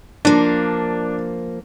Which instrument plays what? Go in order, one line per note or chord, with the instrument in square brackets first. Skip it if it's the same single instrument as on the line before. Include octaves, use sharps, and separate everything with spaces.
[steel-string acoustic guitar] F3 A#3 [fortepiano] D4